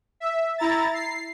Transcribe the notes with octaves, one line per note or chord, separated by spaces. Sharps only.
E5
E4 A#5 A6
C7